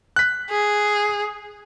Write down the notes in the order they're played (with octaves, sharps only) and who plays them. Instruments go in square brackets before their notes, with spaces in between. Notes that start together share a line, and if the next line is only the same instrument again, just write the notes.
[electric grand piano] F#6 B6
[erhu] G#4